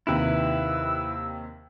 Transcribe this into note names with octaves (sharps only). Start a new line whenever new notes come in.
D#2 C3 D#3 E4 B4 E6